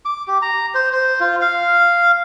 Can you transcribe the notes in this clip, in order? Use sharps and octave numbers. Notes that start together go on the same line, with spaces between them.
D6
G4
A#5
C5
C5
F4
F5